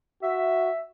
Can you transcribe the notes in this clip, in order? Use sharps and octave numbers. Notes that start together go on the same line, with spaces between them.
F#4 E5